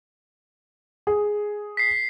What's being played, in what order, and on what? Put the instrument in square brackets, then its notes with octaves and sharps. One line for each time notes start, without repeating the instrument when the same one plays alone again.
[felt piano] G#4
[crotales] B6 C7